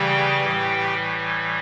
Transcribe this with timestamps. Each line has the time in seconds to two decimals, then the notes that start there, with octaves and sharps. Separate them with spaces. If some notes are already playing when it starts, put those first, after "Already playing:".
Already playing: C#3 E3 G3 G4 G5
0.44 A2 E3 G3